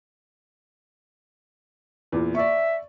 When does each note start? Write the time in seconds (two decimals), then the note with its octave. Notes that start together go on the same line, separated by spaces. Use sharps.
2.12 E2 A#2
2.35 D5 E5 C#6